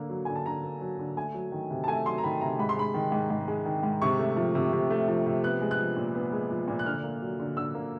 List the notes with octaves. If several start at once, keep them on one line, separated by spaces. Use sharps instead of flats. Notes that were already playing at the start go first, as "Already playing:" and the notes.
Already playing: D3 A#3
F#3
D3 G#5
A5
D3 A#5
A#3
F#3
D3
A3 G#5
F#3
D#3
C3
A5
A3 G#5
F#3 C6
A#5
D#3 B5
C3 A#5
G#2 B5
C6
G#3 B5
D#3
G#2
G#2
G#3
D#3
G#2
C3 C#6
A3
F3
C3
C3
A3
F3
C3
B3 F#6
G#3
F#6
F3
A#2
B3
G#3
F3
A#2
F#6
D3 F6
A#3
F#3
D3
D3 E6
A#3